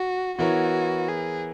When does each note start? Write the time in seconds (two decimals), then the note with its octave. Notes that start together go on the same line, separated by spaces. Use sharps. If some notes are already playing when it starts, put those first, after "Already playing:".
Already playing: F#4
0.38 E3 B3 E4 F#4 A#4 C#5
1.08 G#4